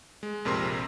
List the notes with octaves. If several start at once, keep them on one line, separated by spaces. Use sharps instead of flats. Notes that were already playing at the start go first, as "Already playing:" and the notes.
G#3
A#1 F2 C3 A#4 C6 E6